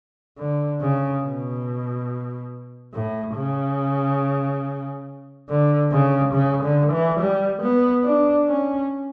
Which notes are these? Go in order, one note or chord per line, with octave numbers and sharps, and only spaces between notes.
D3
C#3
B2
A2
C#3
D3
C#3
C#3
D3
E3
G3
B3
D4
C#4